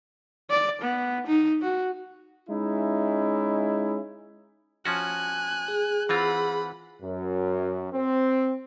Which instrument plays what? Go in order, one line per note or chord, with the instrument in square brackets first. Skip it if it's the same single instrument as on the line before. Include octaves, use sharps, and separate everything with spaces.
[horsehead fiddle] D5
B3
D#4
F#4
[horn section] G#3 C#4 D#4 E4
[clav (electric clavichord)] F3 C#4 F#4 [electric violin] G#5 F#6
[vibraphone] G#4
[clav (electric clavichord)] E3 C4 F4 [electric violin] F#5 B5
[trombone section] F#2
C4